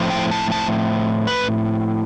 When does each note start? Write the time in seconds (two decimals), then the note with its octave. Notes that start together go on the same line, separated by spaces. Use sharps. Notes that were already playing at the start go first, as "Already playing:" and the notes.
Already playing: A2 F3 C4
0.10 G5
0.31 A5
0.52 A5
1.27 B4